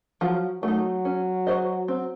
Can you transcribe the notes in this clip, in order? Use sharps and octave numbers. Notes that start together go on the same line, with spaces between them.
F3 F#3
F#3 A3 D#4
C#4
F#4 C5 D#5
C4